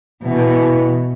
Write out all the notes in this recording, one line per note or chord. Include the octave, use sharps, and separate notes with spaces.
B2 E3